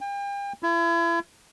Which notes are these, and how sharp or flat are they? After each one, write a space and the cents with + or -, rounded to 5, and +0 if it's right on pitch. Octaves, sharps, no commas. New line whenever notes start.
G5 +40
E4 +40